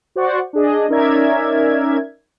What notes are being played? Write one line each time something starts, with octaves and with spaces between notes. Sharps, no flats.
F#4 C5 D5 F#5 C#6
D4 G#4 D#5
C#4 D#4 A#4 D5 E5 G#6